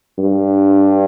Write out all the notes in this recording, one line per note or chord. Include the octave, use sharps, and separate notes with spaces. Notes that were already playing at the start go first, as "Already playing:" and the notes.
G2